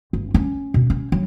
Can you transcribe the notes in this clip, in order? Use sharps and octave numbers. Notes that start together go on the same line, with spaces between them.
G1
C#4
B2
C#4
F#3